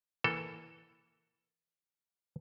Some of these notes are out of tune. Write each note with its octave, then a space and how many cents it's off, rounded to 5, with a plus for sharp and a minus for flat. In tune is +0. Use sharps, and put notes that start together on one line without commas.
E3 +0 A#3 +0 A4 +5